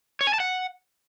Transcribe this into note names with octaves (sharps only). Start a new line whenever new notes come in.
C#5
G#5
A5
F#5